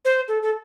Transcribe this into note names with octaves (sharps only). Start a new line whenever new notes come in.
C5
A4
A4